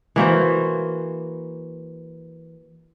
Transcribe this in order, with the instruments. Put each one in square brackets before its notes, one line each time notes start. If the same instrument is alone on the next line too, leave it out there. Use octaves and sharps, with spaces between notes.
[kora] E3 A#3 F#4 C5